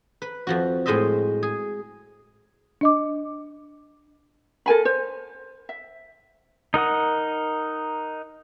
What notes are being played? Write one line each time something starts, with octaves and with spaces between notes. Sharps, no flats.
B4
F2 F3 F#4
A2 G#3 C5 D#5 E5
G#4
D4 D#5 D6
A4 A#4 G#5 B5
C5
E5
D#4 A#4 F#5 D#6